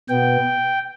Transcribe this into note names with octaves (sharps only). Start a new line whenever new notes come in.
B2 B3 G5